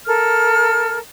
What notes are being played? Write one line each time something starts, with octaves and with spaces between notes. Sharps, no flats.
A4 A#4 F6